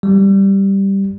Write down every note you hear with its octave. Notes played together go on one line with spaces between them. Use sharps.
G3